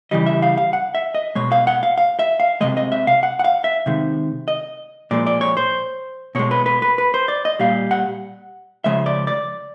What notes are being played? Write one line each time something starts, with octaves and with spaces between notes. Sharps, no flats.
C#3 E3 G3 D#5
E5
F5
F5
F#5
E5
D#5
B2 G#3 C#5
F5
F#5
F5
F5
E5
F5
C3 F3 G#3 D#5
D#5
E5
F5
F#5
F#5
F5
E5
C3 D#3 G#3
D#5
A#2 F3 G#3 D5
D5
C#5
C5
B2 G#3 C#5
B4
B4
B4
B4
C5
D5
D#5
A#2 G3 F5
F#5
C#3 F3 G#3 E5
D5
D5